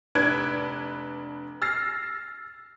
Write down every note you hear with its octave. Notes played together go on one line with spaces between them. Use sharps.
F1 D4 B4 G#6 D7
E6 F6 A6 A#6 C7